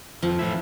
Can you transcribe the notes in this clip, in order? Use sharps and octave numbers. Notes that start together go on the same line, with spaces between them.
F2 F3
E3 A3 E4